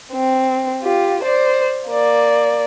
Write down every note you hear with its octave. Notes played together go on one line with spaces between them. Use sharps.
C4
F4 G4
C5 D5
A#3 D5